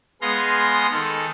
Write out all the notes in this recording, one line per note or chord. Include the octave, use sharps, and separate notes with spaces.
G#3 B3 G#4 F5 C6 A#6
D#3 A4